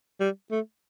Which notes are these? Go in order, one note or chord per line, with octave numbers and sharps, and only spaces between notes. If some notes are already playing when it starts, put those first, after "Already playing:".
G3
A3